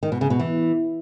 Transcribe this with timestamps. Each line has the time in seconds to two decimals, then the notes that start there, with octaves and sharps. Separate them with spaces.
0.03 D#3
0.12 B2
0.21 C#3
0.30 B2
0.40 E3